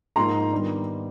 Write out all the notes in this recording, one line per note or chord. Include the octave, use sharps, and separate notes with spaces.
G#2 F3 A#3 D#4 A#5 C6
D#3 G3 B3 D4